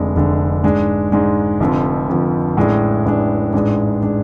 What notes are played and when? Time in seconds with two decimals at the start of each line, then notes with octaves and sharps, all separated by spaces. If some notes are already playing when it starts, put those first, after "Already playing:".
Already playing: F1 F2 D3 G#3 D4
0.15 F1 F2 D3 G#3 D4
0.64 G#2 G#3 D4
1.12 G#2 G#3 D4
1.60 F1 F2 D3 F3
2.09 F1 F2 D3 F3
2.57 A1 A2 G#3 D4
3.05 A1 A2 G#3 D4
3.53 A1 G#2 G#3 D4
4.03 G#3 D4